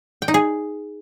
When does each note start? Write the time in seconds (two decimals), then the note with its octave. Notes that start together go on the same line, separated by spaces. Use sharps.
0.22 G5
0.28 D#4
0.34 G#4